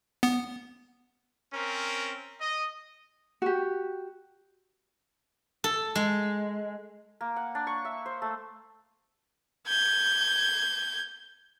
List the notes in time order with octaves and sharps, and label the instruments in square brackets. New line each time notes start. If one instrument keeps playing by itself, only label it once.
[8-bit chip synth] B3
[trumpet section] C4 C#4 A#4
D#5
[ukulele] F#4 G4
[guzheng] A4
G#3
[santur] A#3
F#5
D4
C#6
E5
C5
A3
[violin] G6 G#6